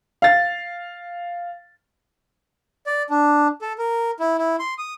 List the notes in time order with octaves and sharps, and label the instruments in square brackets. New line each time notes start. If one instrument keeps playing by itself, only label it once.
[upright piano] F5 A6
[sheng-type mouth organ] D5
D4
A4
A#4
E4
E4
C6
D#6